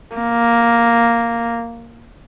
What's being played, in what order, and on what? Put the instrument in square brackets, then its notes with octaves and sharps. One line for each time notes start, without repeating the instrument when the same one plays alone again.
[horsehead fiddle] A#3